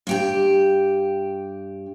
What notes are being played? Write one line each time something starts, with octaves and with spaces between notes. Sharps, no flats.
G2 G4 G5